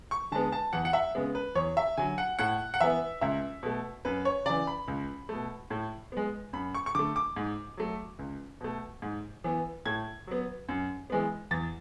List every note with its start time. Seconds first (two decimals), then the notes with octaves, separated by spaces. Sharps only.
0.11 C#6
0.32 D3 G#3 B3 A5
0.52 A5
0.73 E2 F#5
0.85 F#5
0.93 E5
1.15 C#3 G#3 B3
1.35 B4
1.55 E2 C#5
1.77 E5
1.97 D3 F#3 G#5
2.18 F#5
2.39 A2 F#5
2.74 F#5
2.81 E3 B3 E5
3.21 C#2 E5
3.63 B2 A3
4.05 F#2 B4
4.25 C#5
4.46 C#3 E3 D5
4.67 B5
4.88 C#2
5.29 B2 A3
5.70 A2
6.12 G#3 B3
6.53 F#2 B5
6.74 C#6
6.86 C#6
6.95 D3 A3 D6
7.16 D6
7.36 G#2
7.77 F#3 A3
8.19 C#2
8.61 B2 A3
9.02 G#2
9.44 E3 B3
9.86 A2 G#6
10.27 F#3 B3
10.68 F#2
11.10 E3 G#3 B3
11.51 E2 A6